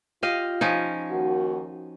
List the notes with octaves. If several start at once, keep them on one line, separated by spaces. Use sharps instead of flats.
F4 G4 D#5 F5
F3 C#4 D#4
D#2 A#3 F#4